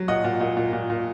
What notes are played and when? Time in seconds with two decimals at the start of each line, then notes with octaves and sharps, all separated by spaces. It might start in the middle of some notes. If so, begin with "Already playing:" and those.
Already playing: F#3
0.08 A#2 D#5 F#5
0.24 A#2
0.40 A#2
0.57 A#2
0.73 A#2
0.90 A#2